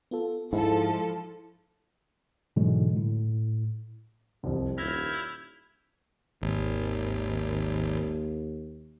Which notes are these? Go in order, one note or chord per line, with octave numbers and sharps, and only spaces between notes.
B3 F4 A4
G#2 F3 E4 A4
G#2 B2 D3 E3 F#3 G#3
A2
C2 F2 G3
D#1 E4 F6 G6 G#6 A#6
G#1 D#2